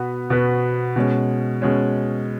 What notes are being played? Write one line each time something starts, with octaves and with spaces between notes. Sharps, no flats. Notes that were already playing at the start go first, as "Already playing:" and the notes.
Already playing: B2 B3 F#4 B4
B2 B3 F#4 B4
B2 G#3 C#4
B2 G#3 C#4